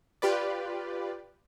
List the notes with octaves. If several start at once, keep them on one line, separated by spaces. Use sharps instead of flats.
F4 G4 B4 D5